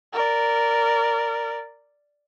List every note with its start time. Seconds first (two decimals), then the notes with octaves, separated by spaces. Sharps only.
0.13 A#4 D5